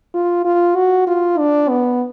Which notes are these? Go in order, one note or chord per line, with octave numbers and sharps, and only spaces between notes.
F4
F4
F#4
F4
D4
B3